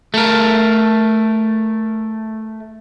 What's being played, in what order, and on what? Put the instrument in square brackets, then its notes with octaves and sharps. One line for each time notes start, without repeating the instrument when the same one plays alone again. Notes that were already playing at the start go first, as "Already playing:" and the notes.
[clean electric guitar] A3 A#4